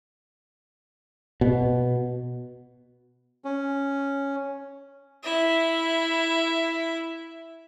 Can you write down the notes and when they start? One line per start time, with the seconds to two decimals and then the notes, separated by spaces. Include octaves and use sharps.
1.41 B2
3.45 C#4
5.23 E4 E5